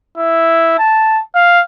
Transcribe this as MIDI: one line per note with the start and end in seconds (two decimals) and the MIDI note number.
0.17 0.77 64
0.79 1.21 81
1.35 1.62 77